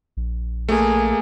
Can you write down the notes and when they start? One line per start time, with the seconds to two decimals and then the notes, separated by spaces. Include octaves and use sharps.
0.17 A#1
0.69 A3 A#3 G#4